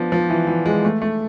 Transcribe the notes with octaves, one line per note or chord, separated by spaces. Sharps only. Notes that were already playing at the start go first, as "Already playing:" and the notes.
Already playing: F3 B3 D4
F3
E3
E3
G#3
A3
A3